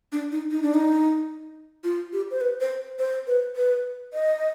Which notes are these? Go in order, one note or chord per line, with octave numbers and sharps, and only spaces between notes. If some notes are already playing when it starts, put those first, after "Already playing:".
D4
D#4
D#4
D4
D#4
F4
G4
C5
B4
C5
C5
B4
B4
D#5